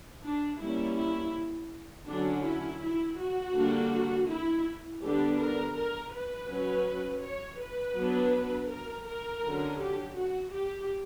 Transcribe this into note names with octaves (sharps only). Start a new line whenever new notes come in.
D4
G3 A#3 C#4 E4
E4
D3 F#3 C#4 D4
E4
E4
F#4
D3 G3 A#3 D4
E4
D3 G3 B3 D4 G4
A#4
A#4
B4
F#3 C#4
C#5
B4
F#3 B3 D4
A#4
A#4
D3 F#3 C#4
G4
F#4
G4